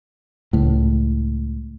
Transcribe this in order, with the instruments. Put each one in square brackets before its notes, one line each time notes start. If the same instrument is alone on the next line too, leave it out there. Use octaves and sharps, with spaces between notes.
[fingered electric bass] C#2 A2